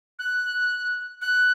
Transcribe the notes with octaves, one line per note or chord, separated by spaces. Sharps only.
F#6
F#6